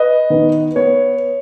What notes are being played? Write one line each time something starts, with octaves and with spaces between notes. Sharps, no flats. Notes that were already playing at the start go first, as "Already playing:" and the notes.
Already playing: B4 D#5
D#3 B3
B3 C#5